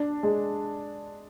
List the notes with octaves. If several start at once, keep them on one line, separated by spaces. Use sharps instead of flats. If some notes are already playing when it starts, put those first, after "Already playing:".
Already playing: D4
G#3